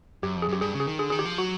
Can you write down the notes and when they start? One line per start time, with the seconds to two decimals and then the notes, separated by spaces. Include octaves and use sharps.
0.23 F#2 G4
0.36 F2
0.42 G#4
0.49 F#2 G4
0.61 G2 G#4
0.74 C#3
0.80 G#4
0.87 D#3
0.99 D3 G#4
1.10 D#3 G#4
1.19 G4
1.25 F3
1.38 F#3 F#4